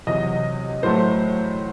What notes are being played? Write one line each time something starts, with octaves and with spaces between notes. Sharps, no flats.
E2 C3 F#3 D#5
A2 F#3 A3 C5